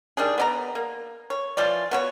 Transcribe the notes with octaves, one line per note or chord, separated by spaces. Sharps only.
D#3 G3 D4 G#4
B3 D5 A#5
A#3
C#5
E3 F3 F4 D5
B3 F#4 C#5